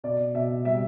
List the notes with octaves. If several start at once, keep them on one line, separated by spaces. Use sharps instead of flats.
B2 D5
B2 E5
G3 E5